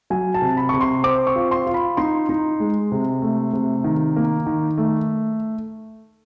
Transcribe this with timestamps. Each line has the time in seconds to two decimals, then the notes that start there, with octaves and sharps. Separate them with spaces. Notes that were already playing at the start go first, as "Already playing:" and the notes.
0.10 F#3 G#5
0.34 A5
0.42 C3
0.57 B5
0.69 C3 C#6
0.81 C6
1.04 C4 D6
1.27 C#6
1.36 F4
1.51 C6
1.67 F4
1.74 B5
1.97 D#4 C6
2.29 D#4
2.60 G#3
2.92 C3
3.22 A3
3.53 C3
3.84 D#3
4.16 A#3
4.46 D#3
4.78 A3